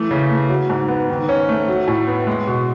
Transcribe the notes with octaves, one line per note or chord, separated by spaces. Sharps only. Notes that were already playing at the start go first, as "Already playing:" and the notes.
Already playing: E3 A3
C#3
A3
F#3
G#2
B3
D#3
C#4
A3
F#3
A2
B3
G#3
B2